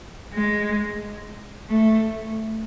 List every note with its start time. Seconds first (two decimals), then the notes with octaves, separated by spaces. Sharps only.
0.33 G#3
1.69 A3